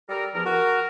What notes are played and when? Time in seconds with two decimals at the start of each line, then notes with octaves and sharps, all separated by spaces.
0.09 G3 A4 A#4
0.34 E2 F3 A#4
0.45 F#4 A#4